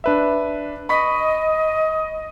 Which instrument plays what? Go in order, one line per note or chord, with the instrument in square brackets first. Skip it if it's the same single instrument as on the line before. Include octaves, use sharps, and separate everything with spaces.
[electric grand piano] D4 B4 E5
[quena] D#5 [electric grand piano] B5 C#6 B6